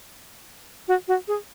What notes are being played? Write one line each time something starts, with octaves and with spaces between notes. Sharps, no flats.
F#4
F#4
G#4